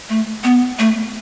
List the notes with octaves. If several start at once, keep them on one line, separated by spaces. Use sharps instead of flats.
A3
B3
A3